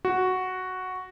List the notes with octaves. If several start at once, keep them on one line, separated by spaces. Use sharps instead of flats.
F#4